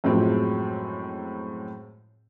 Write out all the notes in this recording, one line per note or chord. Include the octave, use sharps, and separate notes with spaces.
F#2 A2 F3 F#3 G#3 C4